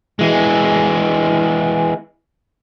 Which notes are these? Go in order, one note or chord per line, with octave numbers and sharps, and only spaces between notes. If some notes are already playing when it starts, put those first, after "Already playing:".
E3 G#3